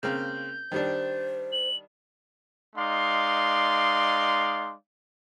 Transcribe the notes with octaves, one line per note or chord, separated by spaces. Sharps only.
C#3 A#3 C4 G6
D#3 G3 D4 C5
F#7
G#3 D#4 D5 F5 C6